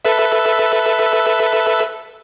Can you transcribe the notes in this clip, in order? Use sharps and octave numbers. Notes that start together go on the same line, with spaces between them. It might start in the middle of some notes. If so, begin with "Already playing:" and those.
A4 B4 E5